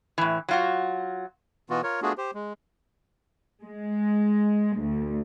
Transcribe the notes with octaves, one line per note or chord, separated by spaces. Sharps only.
A2 E3
F#3 F4 F#4
B2 E3 B3 F4 F#4
F4 A#4 C#5
A3 B3 D4 F4 F#4 G#4
G4 C5
G#3
G#3
D2